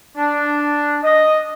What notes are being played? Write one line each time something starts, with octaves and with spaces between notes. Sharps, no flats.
D4
D#5